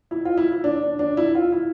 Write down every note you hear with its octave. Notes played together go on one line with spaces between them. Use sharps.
E4
F4
E4
E4
D4
D4
D4
E4
F4
E4